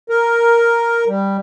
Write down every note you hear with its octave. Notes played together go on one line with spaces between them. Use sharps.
A#4
G3